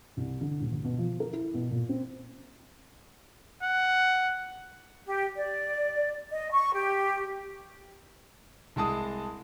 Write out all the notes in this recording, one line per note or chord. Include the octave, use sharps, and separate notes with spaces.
C2
D3
D#1
D2
B2
F3
A#4
E4
B2
A#2
C4
F#5
G4
D5
D#5
C#6
G4
C2 G#3 A5 D#6